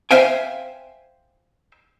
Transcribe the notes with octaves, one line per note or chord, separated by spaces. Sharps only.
C5 E5 F5 G5 G#5